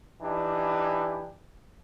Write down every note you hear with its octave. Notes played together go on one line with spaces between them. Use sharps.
E3 D4 D#4 G4